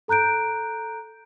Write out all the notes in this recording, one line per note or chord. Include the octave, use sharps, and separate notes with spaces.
A4 A#5 F#6 G6 D7